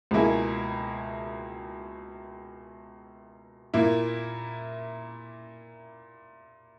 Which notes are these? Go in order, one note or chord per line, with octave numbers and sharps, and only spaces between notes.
C#2 B2 A#3 E4 G#4
A#2 A#3 E4